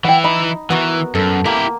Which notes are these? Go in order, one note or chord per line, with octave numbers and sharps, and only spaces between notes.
E3 E4 F#5 G5
D#4 B5
E3 B3 F#4 A#4
F#2 A4
A#3 E4 G4